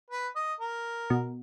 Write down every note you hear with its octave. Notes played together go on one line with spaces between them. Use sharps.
B4
D#5
A#4
B2